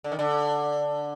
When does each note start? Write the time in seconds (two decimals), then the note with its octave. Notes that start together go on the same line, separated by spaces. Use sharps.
0.04 D3
0.12 D#3
0.19 D3